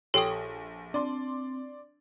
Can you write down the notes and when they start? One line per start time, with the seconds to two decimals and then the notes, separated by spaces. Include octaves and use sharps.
0.14 A#1 G4 A4 C#5 G5 C6 D#6
0.94 C4 D4 D5 C6